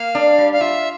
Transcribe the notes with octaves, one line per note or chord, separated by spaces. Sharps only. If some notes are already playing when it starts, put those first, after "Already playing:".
Already playing: A#3 F5
D4
G3
F5
F4 E5